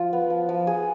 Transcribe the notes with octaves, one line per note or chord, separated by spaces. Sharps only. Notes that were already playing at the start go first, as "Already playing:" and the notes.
Already playing: F3 F4
B3
F3
F3
G#4